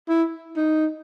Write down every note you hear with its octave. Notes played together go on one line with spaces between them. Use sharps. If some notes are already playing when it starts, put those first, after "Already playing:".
E4
D#4